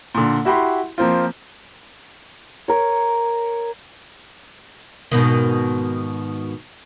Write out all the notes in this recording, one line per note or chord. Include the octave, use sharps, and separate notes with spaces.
A#2 D3
E4 F#4 G4 B5 C6
F3 A#3 C4 F4
A#4 C#5
G#2 B2 D#3